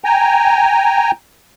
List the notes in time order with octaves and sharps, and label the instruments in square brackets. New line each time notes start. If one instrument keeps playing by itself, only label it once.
[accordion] G5 G#5 A#5